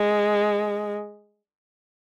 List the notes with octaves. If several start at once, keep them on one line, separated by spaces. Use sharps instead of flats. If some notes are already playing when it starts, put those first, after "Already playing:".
Already playing: G#3